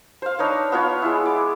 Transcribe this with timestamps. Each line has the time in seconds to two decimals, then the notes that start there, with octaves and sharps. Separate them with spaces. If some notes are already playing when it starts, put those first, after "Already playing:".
0.22 C5 F5
0.39 D4 D#4 B4 C#5
0.72 B3 F4 C#5
1.02 G#3 E4
1.26 D6